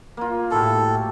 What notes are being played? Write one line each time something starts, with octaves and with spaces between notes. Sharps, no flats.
A#3 F4
A2 E4 F#4 G4 A4